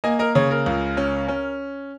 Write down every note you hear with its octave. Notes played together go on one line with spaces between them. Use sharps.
A#3 D#5 G#5
A#4 D#5
C#3 C#5
A#4
C#2
C#4
C#4